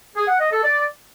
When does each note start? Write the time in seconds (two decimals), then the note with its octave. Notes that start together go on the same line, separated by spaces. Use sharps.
0.15 G#4
0.27 F#5
0.39 D#5
0.51 A4
0.63 D5